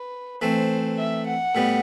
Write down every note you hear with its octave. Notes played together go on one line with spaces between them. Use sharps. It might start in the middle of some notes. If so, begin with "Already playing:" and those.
Already playing: B4
E3 A3 C4 C5
E5
F#5
A2 G3 B3